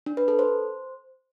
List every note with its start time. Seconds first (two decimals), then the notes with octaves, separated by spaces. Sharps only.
0.06 D4
0.17 B4
0.28 A4
0.39 C5